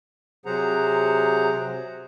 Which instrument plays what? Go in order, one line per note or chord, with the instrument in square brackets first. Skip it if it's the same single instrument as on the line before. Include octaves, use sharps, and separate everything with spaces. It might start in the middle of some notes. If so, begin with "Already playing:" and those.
[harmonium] C3 F#3 G#4 C5 F#5 A#5